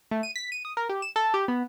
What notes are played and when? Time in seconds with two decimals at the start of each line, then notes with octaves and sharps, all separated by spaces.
0.11 A3
0.23 D#7
0.36 B6
0.52 D#7
0.65 D#6
0.77 A#4
0.89 G4
1.02 E7
1.16 A4
1.34 G4
1.48 B3